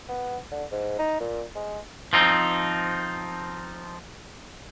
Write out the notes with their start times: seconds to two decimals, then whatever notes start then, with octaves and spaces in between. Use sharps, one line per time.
0.09 B3
0.51 D3
0.72 G#2
0.98 D#4
1.20 A#2
1.55 G#3
2.13 F3 C4 D#4